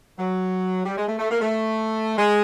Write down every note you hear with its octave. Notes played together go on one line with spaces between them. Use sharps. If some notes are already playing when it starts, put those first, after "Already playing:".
F#3
G3
G#3
A3
A3
A#3
A3
G#3